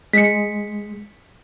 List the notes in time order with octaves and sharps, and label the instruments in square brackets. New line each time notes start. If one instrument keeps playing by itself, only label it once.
[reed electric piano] G#3 [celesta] B6 C#7